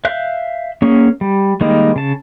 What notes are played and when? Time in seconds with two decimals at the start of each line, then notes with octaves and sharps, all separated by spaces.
0.05 E5 F5 F#6 G6
0.82 A#3 C#4 G#4
1.21 G3
1.61 D#3 G3 G#3 A#3 D#4
1.96 C#3 A5